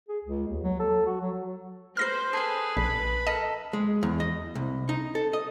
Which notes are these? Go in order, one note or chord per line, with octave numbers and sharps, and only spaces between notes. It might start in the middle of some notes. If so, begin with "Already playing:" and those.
G#4
C#2
D#2
F#3
A4
F#4
F#3
B4 C5 F6 A#6 C7
G#4 A4 B4 G#5
A#1 B5
A4 A#4 D#5
G#3
E2
D#5
C2
D#4
A4
D#5